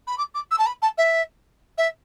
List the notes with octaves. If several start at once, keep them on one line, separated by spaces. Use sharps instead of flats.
B5
D6
D6
E6
A5
B5
A5
E5
E5